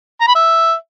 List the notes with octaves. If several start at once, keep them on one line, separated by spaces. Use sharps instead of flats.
A#5
B5
E5